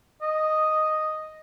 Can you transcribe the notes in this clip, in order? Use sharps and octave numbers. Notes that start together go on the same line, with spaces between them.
D#5